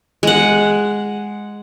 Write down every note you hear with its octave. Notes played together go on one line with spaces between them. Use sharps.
G#3 F#5